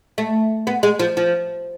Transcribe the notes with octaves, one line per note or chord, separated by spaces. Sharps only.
A3
B3
G#3
F3
F3